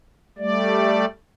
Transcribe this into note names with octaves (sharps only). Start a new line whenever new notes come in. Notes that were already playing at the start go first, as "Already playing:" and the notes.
G3 A3 D5